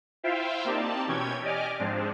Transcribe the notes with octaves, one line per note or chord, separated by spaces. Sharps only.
E4 F4 C5 E5 F5 G5
A#3 C4 D#4 G4 D5 A5
B2 E3 C#4 C#5 G5 G#6
G4 D5 D#5 G#5 D6 F6
G#2 F3 G#3 C4 D4